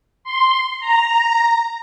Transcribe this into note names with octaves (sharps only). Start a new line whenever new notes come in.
C6
A#5